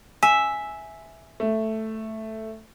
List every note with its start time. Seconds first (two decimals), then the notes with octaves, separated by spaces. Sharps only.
0.23 E5 G#5
1.40 A3